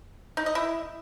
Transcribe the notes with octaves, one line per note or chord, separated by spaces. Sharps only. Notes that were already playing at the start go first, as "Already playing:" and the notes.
D#4
D#5
E4